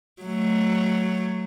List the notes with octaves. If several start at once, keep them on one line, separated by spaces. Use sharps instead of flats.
F#3 A3